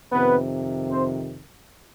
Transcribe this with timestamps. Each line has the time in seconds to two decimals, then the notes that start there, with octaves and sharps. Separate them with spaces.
0.11 F2 C3 D#3 B3 B4
0.91 C4 C5